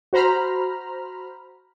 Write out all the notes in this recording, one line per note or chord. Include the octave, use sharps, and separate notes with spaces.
F#4 C5 A#5 B5 F6